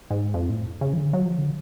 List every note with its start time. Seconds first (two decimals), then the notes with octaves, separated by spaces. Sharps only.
0.11 G#2
0.34 F2
0.50 A2
0.81 C#3
0.93 F3
0.97 D3
1.13 F#3
1.25 F3
1.38 D3